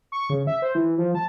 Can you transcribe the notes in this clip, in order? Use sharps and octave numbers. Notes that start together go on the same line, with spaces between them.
C#6
C#3
E5
C5
E3
F3
A5